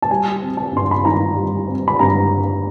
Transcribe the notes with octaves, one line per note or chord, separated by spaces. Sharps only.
A5
G3 G#5
C4
A5
G2 C6
B5
D#3 A#5
G3
C4
B5
G2 A#5